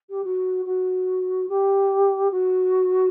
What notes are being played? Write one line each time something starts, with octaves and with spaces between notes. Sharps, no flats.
G4
F#4
F#4
G4
F#4